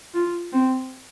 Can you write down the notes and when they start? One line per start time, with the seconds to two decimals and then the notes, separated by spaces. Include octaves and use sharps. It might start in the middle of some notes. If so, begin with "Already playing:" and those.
0.14 F4
0.53 C4